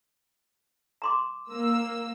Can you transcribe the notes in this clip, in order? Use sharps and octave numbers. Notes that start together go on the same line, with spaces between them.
A#5 C6 D6
A#3 E6